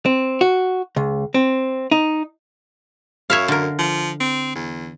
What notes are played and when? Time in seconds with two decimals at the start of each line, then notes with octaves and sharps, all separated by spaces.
0.06 C4
0.41 F#4
0.96 C#2
1.34 C4
1.91 D#4
3.30 F#2 C#5 E5 F5
3.48 D3 A#4
3.79 F3
4.20 C4
4.55 E2